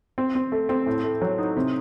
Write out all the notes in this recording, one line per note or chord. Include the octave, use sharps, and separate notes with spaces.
C4
C4
A3
C4
A2
A3
F#3
D#4
C3